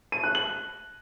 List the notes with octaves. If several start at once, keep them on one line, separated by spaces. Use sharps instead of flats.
D#7
F#6
F#7